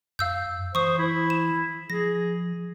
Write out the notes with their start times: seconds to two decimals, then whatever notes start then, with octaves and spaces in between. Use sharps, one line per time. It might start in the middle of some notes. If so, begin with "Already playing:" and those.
0.19 F#2 F5 E6 G6
0.75 E3 C5 C#6 D#6
0.98 E4
1.30 E7
1.90 F3 G#4 A#6